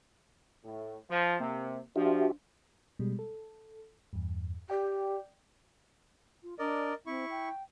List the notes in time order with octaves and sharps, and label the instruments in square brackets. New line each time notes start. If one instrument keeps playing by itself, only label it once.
[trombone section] A2
F3
[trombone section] C3 [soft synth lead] A#3
[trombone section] F3 [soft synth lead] D4 [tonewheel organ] F#4 G4 E5
[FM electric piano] B2 G3 G#3
A4
E2 G2
[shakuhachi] G4 [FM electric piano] D5 G5
[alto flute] F4
[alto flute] D4 [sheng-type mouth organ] A#4 D5 D#5
[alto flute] C4 [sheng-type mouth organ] E4 C#6
[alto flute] G5